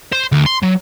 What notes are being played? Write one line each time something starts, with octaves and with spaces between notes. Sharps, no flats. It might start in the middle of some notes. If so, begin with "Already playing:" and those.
C5
D2
C6
F#3